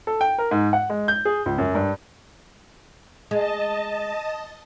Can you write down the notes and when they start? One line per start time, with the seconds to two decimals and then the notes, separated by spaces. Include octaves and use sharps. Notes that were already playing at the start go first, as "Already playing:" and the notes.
0.07 A4
0.21 G5
0.38 A#4
0.51 G#2
0.73 F#5
0.90 G#3
1.08 G6
1.25 G#4
1.46 C#2
1.58 F#2
1.75 G2
3.31 G#3 D#5 A5